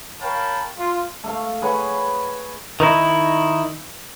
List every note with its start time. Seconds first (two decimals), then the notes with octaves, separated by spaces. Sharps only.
0.21 A#4 C#5 F5 G5 A5 B5
0.78 F4
1.23 A3 A4 F5
1.62 G#4 B4 C#5 F#5
2.80 D#3 D#4 E4